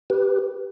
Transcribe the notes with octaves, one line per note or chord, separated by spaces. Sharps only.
G4 B4